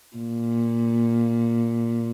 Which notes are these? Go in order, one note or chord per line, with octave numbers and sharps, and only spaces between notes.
A#2